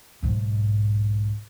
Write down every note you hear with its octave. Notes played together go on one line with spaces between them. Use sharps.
B1 G#2